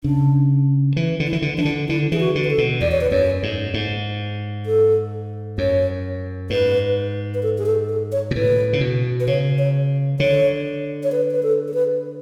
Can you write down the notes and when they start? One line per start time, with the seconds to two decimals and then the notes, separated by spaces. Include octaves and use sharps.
0.04 C#3 D4
0.96 E3
1.20 D3
1.27 E4
1.33 E3
1.42 D3
1.58 E3 D4
1.65 D3
1.88 D3 E4
2.12 E3 G#4
2.20 F#4
2.35 D3
2.44 B4
2.51 A4
2.58 B2
2.81 E2 D5
2.92 C#5
3.01 B4
3.11 F#2 C#5
3.43 G#2
3.74 G#2
4.66 A4
5.58 F#2 C#5
6.50 G#2 B4
7.34 B4
7.43 A4
7.58 G#4
7.66 A4
7.89 A4
8.12 C#5
8.31 B2
8.35 A2 B4
8.73 C#3
8.81 B2
9.20 B4
9.27 C#3 C#5
9.58 C#5
10.20 D3 C#5
11.03 C#5
11.12 B4
11.31 B4
11.43 A4
11.68 A4
11.74 B4